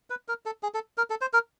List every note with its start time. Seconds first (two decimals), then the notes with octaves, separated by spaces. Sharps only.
0.10 B4
0.28 A#4
0.46 A4
0.63 G#4
0.74 A4
0.98 A#4
1.10 A4
1.21 C5
1.33 A#4